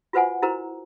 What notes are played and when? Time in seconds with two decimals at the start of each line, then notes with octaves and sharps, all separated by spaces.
0.13 F4 F#4 B4 C5 F#5 G#5
0.42 E4 F#4 A#4 C5 A#5